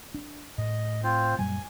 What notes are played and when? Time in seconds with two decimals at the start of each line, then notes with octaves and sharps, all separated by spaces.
0.14 D4
0.58 A2 D#5
1.04 C4 F4 C5
1.39 F#2 A#2 G3 G#5